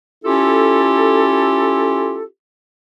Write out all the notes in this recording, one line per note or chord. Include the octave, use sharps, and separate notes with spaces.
C#4 E4 F4 G4 A4